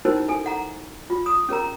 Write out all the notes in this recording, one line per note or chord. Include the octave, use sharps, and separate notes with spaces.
C#4 D#4 E4 F#4 A#4 C5
A4 G#5
F#5 A#5
F4
D#6
C#4 G#4 A#4 A#5